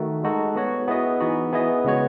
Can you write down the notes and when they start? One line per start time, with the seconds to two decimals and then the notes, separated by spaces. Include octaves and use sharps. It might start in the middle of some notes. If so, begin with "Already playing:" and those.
Already playing: D#3 A3 D#4 F#4
0.24 G#3 D#4 F#4 A4
0.56 B3 F#4 C#5
0.88 B3 E4 G#4 B4 D#5
1.20 E3 B3 D#4 F#4
1.53 B3 E4 G#4 D#5
1.85 C#3 G#3 B3 F#4 C#5